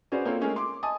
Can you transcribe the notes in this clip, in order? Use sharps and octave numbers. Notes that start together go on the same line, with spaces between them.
C#4 F#4 G#4 B4 C5 D5
A#3 C4 F4 A4 A#4 C#5
G#3 A3 C#4 D#4 G#4 A#4
C6 D6
D#5 G#5 A5 D#6